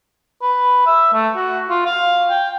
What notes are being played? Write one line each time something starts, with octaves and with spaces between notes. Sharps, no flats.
B4
E5
A3
F#4
F4
F5
G5